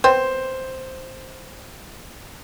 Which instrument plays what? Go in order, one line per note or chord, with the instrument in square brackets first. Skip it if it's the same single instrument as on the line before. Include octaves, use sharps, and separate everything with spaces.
[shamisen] B3 C4 [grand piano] C5